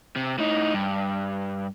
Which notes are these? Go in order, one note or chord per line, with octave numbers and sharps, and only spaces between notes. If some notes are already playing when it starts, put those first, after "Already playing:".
C3
A2 D#4
G2